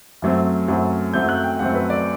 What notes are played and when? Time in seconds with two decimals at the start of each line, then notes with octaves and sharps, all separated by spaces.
0.22 F#2 F#3 A3 C4
0.68 F#2 F#3 A3 C4
1.13 F#2 F#3 A3 C4 G6
1.29 F#6
1.44 G5
1.59 F#2 F#3 A3 C4 F#5
1.75 B4
1.90 D5